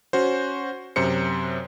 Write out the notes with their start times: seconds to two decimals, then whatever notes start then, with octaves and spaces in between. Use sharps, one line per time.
0.13 C#4 F#4 C5
0.96 F#2 C3 C5 C#7